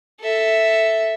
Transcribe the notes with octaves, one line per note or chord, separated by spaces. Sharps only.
A4 E5